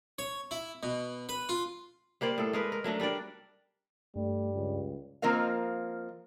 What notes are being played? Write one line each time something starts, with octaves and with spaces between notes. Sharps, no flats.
C#5
E4
B2
B4
F4
G3 A#3 C5 D5
A2 A4
G#3 A#4 B4
A#4
F#3 A3 C#4 D4
G3 D4 A#4 D5
G2 G3 A3
C#2
F3 A#3 C4 A#4 D#5 F5